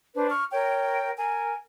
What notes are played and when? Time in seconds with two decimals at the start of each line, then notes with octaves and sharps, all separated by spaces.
0.16 D4 B4 C5
0.30 C#6 F6
0.51 A#4 C#5 G5
1.18 A#4 G#5